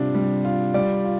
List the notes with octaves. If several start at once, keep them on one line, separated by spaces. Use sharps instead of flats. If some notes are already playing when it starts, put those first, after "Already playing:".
Already playing: C3 G3 D4 F4
G3
F4
G3 D5
F4